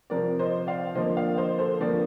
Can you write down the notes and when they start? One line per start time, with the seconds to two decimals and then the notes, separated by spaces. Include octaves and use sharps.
0.10 C3 F3 C4 A#4 D5
0.39 C5 D#5
0.67 D5 F5
0.95 D3 F3 A#3 C5 D#5
1.17 D5 F5
1.38 C5 D#5
1.59 A4 C5
1.81 D3 F3 A#3 A#4 D5